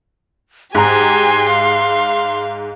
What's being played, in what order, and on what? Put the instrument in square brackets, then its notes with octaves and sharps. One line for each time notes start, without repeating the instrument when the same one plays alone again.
[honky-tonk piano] G#2 A#5 [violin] G4 G#5 [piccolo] C6
[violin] F5